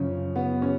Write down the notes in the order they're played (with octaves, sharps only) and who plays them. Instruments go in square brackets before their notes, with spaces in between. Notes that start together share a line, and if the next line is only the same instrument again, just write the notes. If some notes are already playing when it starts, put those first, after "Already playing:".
Already playing: [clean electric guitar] F#2 C#3 F3 [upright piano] C#4
[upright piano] B3
C#4